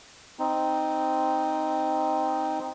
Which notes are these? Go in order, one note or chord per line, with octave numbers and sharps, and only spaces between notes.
C4 D#4